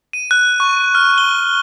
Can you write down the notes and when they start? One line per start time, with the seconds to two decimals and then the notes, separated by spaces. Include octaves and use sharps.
0.13 D#7
0.31 F#6
0.60 C#6
0.95 F6
1.18 G7